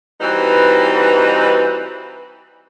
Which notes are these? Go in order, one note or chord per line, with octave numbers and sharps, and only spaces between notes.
E3 G3 C4 D#4 F#4 B4